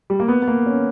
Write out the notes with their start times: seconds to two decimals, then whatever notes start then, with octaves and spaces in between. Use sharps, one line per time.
0.10 G3
0.20 A#3
0.28 B3
0.42 B3
0.48 A#3
0.66 C#4